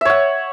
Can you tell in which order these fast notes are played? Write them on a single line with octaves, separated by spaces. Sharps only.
E5 C#5 F#5